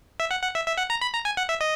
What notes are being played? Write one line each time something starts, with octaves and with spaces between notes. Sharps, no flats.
E5
F#5
F#5
E5
E5
F#5
A#5
B5
A#5
G#5
F#5
E5
D#5